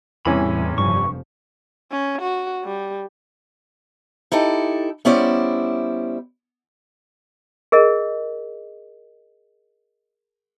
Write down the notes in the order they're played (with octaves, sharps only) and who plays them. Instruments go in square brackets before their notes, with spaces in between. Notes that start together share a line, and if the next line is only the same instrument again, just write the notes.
[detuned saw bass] E2 [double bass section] A2 G3 [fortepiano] C3 E3 C#4 [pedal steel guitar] B5
[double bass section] F1 F3 [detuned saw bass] G2 [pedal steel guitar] C#6
[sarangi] C#4
F#4
G3
[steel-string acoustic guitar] D#4 E4 G4 A4
G3 B3 C#4 E4 C5 D5
[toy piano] G#4 A#4 D#5